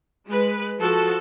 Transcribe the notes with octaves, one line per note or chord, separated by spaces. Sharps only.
G#3 B4
F3 F#4 A4